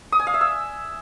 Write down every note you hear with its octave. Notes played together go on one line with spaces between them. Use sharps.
D#6
G#5
F5
E5
E6